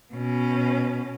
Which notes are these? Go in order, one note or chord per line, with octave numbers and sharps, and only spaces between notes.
B2 C#4